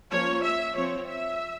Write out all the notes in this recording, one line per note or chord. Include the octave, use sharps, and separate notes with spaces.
F3 A#3 C#4 C#5
E5
F3 C4 C#5
E5